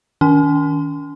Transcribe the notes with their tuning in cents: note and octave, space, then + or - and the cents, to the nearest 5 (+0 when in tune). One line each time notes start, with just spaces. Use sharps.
D#3 +20 C#4 +45 C6 -25